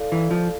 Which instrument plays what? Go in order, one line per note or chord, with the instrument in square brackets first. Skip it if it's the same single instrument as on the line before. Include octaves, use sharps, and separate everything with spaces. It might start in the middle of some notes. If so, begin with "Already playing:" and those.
Already playing: [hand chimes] E4 A4 D5 F5
[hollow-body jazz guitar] E3
F3